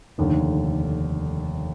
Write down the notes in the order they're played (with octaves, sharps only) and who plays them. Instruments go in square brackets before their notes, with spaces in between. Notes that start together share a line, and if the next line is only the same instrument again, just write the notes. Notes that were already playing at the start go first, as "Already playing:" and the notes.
[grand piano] F1 D#2 D3